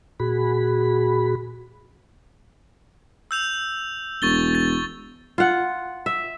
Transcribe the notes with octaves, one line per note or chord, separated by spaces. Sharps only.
A#2 F#4 G#4 B5
E6 G6 F7
E1 C#6 A6 G7
A6
F4 F#5
E5